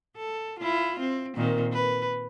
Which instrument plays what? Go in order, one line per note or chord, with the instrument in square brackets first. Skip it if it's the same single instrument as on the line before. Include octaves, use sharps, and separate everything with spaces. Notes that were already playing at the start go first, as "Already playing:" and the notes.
[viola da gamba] A4
E4 F4
C4
A#2 D#3 C4
B4